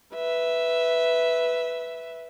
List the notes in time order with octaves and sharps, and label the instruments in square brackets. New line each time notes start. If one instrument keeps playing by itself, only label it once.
[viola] B4 E5